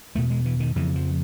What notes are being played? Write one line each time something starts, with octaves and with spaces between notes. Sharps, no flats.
E2 B2 A3
G#3
E3
D#3
F2 C#3 E3
F3